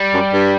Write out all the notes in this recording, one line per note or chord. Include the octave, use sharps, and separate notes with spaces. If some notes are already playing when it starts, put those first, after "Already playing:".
Already playing: G3
F#2
G2